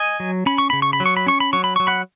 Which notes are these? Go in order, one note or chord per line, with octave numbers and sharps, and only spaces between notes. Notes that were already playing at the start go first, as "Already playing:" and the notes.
Already playing: D#5 G#5
F#3
C#4 B5
C#6
C#3 B5
C#6
B5
F#3
C#6
B5
C#4 C#6
B5
F#3 C#6
B5
F#3 C#6
F#5 B5